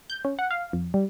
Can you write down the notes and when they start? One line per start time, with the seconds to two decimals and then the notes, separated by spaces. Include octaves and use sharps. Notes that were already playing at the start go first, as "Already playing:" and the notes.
0.10 G6
0.25 C#4
0.39 F#5
0.51 F5
0.73 F2
0.94 G3